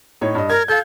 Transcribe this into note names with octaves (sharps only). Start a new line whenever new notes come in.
A2 D#4 C#5
G2 D#5
A#4 G#6
A4 F5 G6